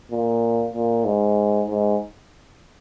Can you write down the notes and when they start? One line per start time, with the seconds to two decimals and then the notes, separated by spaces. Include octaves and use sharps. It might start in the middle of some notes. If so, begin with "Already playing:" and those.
0.11 A#2
0.74 A#2
1.05 G#2
1.67 G#2